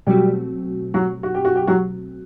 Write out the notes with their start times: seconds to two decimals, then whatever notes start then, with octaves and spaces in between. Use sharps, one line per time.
0.07 B2 F#3 G3 A3 C4 F#4 G4
0.94 F#3 F#4
1.23 F#4
1.35 G4
1.45 F#4
1.56 G4
1.67 F#3 F#4